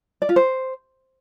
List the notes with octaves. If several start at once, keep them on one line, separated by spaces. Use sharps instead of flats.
D5
F4
C5